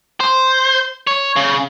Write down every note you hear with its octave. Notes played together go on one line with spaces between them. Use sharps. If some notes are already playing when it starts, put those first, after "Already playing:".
C5
C#5
C#3